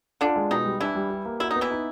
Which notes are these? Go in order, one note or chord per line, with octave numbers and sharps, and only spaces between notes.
D3 D4 F4
G#3
B2 D#3 D#4
G3
E3 D4 E4
G3
G4
A#3
E4 F#4
D#4
B3
E3 E4
D#4